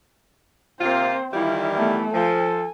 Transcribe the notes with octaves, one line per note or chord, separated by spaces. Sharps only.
C3 A#3 C4 F4 C5
D#3 E3 G3 E4 F4
A3 B3 E4
F3 A4 G#5